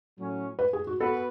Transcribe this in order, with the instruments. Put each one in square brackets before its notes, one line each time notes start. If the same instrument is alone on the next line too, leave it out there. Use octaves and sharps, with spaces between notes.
[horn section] A2 F#3 C#4
[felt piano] B4
G#4
F#4
[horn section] B3 F#4 B4 [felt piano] A4